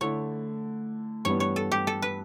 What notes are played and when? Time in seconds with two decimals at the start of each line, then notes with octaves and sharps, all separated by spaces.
0.01 D3 A3 E4 C#5
1.25 G2 E3 G3 B3 C#5
1.40 C#5
1.56 A4
1.72 G4
1.87 A4
2.02 B4